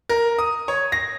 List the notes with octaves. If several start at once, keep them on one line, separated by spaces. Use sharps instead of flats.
A#4
D#6
C#5
A#6